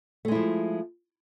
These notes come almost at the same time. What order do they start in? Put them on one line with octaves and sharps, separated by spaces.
A3 G#3 E4 F3